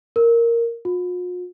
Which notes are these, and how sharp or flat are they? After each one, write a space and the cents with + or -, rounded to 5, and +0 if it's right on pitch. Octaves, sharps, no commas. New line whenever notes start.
A#4 -5
F4 +45